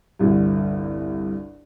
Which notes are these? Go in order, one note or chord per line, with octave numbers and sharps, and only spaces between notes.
G1 C2 G2